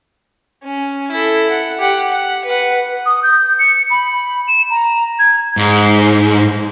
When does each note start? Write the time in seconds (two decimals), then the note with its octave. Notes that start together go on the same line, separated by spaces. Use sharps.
0.64 C#4
1.11 E4 A4
1.50 F#5
1.79 G4 F#5
2.11 F#5
2.45 B4 F#5
3.06 D#6
3.23 G6
3.59 C#7
3.91 B5
4.48 E7
4.70 A#5
5.19 G#6
5.57 G#2